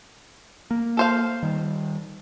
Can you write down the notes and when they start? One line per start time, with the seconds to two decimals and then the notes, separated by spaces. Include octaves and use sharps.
0.71 A#3
0.97 A4 C5 F5
1.43 D#3 G3